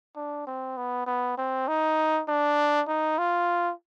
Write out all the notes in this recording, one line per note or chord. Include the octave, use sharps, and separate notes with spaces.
D4
C4
B3
B3
C4
D#4
D4
D#4
F4